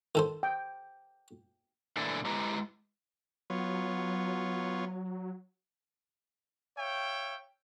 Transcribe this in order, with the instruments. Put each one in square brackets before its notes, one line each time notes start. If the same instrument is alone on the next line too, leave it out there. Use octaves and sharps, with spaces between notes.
[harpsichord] D#3 A4 C5
[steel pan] G5
[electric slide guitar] A#2 D3 E3 A3 D4 E4
G#3 E4 G4 B4 A#5
[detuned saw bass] F#3 [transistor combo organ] B3 F4 C#5
[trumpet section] C#5 E5 F5 G5